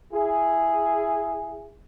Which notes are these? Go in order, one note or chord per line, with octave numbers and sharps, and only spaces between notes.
E4 G#4